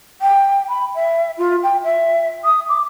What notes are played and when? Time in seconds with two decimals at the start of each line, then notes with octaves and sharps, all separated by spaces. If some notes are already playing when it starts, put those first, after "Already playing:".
0.22 G5
0.69 B5
0.95 E5
1.38 F4
1.63 G5
1.84 E5
2.45 D#6
2.69 D6